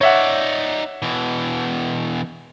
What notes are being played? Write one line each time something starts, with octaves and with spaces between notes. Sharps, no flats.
D#4 C#5 D5 E5 F#5
B2 E3